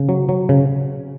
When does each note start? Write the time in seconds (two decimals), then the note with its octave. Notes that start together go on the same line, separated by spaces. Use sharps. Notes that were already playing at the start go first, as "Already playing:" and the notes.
Already playing: C#3
0.09 F#3
0.29 F#3
0.49 C#3